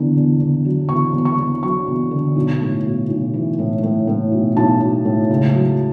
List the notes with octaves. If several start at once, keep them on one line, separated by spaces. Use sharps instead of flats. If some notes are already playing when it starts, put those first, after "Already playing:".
Already playing: E2 D3
E2
E2
F#3
E2 C#6
E2
C#6
E2
F#3 C#6
E2
D3
B1
A2
B1
B1
E3
A2
A2
A2
B1
B1 A5
B1
A2
C#2
F#3